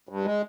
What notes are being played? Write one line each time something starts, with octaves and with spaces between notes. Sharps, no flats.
G2
G#3